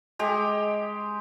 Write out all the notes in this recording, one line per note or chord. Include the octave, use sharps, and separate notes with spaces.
G#3 G4